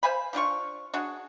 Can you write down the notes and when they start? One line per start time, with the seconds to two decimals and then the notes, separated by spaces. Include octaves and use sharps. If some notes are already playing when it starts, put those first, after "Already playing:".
0.03 C5 F5 G#5 B5
0.33 F3 D4 F4 C#6
0.94 D4 F#4 G#4